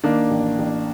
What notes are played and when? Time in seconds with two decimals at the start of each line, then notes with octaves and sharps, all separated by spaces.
0.04 D#3 A#3 D4
0.31 A1
0.59 A1